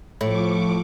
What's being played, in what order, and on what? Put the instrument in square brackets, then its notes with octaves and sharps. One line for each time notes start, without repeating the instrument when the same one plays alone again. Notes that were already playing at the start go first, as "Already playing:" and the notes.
[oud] A2 [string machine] F3 C#6 D6